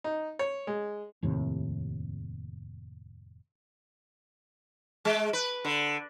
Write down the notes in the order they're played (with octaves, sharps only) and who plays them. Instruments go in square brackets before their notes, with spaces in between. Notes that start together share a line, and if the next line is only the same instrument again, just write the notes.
[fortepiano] D#4
C#5
G#3
[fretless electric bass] F1 D#2 A2 C3
[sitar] G#3
B4
D3